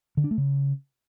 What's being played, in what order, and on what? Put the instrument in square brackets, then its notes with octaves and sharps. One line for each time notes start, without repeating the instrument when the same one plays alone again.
[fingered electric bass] D3
D4
A3
C#3